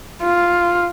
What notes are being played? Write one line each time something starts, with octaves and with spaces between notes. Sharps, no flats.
F4